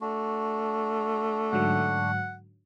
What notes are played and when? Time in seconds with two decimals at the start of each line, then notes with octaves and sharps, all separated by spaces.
0.01 A3 D4 F#4
1.52 G#2 D3 F#3 F#5